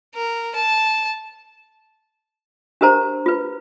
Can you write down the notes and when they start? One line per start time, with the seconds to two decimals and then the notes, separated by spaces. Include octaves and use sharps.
0.15 A#4
0.55 A5
2.81 D4 G4 A#4 C5 A#5
3.26 F4 B4